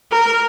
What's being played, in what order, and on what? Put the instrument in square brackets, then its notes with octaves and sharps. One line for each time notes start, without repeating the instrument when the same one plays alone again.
[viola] A#4